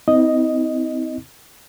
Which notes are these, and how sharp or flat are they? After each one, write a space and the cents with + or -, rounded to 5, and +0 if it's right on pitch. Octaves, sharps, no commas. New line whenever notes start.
C4 -30 E4 -45 D#5 +0